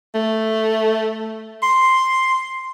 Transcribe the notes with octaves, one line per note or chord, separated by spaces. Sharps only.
A3
C6